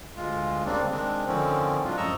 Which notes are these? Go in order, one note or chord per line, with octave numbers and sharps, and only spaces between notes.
D2 G#3 F4
C#3 G3 A#3 C4 D4
D#3 G#3 C4 D4
D3 D#3 F3 C4 C#4
A2 F#3 G#3 D4 F4
F#2 F3 D#5 A#5 C#6 E6